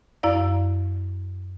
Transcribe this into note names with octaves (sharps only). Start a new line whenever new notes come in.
F#2 E4 D5 F5